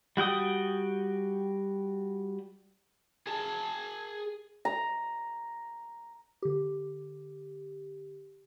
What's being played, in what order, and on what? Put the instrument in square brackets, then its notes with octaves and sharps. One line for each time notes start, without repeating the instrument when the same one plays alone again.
[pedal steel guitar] G3 F#4 G5 D#6
[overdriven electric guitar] G#4 A5
[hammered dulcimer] A#5
[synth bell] D3 G4